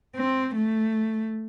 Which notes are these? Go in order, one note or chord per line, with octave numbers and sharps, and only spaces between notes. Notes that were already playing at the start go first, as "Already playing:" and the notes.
C4
A3